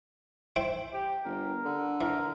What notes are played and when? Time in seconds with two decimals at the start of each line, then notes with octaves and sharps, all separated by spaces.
0.56 E4 C5 G5
0.93 G4
1.25 G1 A#4
1.65 D3
2.01 E3 A#4